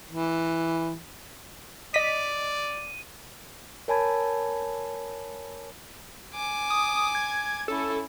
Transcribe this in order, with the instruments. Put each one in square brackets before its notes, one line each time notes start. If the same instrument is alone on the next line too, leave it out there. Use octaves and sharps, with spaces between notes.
[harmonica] E3
[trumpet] D5 [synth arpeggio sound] D#5 B6 [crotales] D#7
[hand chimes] A#4 C#5 G#5 A5 B5 G#6
[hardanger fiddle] G#5 D6
[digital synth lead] D#6
G#6
[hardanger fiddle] C#4 E4 [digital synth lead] A4